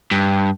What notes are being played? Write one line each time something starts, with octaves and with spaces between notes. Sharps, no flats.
G2